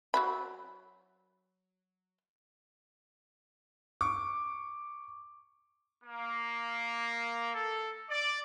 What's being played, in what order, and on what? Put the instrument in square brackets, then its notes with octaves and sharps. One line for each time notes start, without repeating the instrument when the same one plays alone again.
[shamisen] F#3 F#4 B5
[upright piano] C#6 D6
[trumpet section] A#3
A4
D5